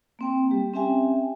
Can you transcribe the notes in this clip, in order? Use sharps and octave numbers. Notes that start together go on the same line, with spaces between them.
A#3 C4 G5
G3 G4
C4 C#4 G4 E5 G5 G#5